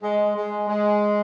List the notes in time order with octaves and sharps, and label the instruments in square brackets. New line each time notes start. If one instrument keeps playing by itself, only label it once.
[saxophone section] G#3
G#3
G#3